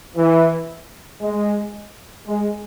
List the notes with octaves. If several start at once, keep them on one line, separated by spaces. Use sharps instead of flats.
E3
G#3
G#3